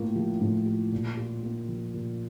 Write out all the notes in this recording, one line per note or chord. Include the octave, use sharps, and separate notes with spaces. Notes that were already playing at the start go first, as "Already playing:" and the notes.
Already playing: A2 A#3 F4
F3
A2
F4
A#2
F4
A#3
F3
A#2